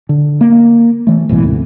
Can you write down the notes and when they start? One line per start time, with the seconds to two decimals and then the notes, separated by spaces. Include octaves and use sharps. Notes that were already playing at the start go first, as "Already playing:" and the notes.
0.09 D3
0.41 A#3
1.07 E3 A3
1.29 A#1 G2 B2 E3
1.43 D2 G#2 C3